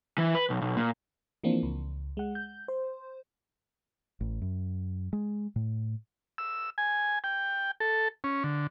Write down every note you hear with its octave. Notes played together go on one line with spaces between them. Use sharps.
E3
B4
B1
B1
A#2
E3 F3 A#3 C4 D4
C#2
G#3 F#5
G6
C5
A1
F#2
G#3
A2
E6
G#5
G5
A4
C#4
D3